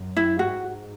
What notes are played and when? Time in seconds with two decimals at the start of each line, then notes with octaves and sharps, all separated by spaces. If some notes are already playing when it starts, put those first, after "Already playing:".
Already playing: F#2
0.17 E4
0.39 G#2 F#4